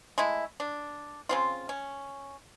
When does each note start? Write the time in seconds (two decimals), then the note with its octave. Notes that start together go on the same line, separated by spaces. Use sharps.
0.18 G#3 A3 E4
0.60 D4
1.29 C#3 C4 F4
1.69 C#4